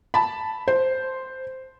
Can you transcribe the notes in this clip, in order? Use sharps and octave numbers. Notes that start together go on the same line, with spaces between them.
A5 B5
C5